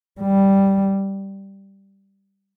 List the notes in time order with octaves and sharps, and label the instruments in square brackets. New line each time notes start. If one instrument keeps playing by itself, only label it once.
[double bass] G3